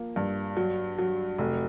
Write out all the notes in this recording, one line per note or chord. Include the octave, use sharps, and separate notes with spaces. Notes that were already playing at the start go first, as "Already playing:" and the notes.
Already playing: F3 A#3
G2
F#3
F#3
F1